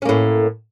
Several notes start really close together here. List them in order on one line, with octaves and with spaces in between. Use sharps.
C#4 A#3 A2